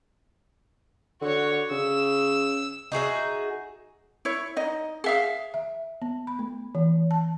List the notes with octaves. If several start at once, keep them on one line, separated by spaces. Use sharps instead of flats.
D3 F#4 C#5
C#3 E6
D#4 F#4 G#4 E5
E4 C#5
D#4 D#5
G#4 E5 F5
E5
B3
B5
A3
E3
A5